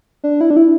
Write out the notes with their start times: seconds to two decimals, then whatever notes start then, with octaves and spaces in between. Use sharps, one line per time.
0.24 D4
0.41 E4
0.50 D4
0.57 E4